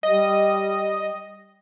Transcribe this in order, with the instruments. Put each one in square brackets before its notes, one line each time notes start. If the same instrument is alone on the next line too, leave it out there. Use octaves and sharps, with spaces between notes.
[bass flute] G3 [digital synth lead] D#5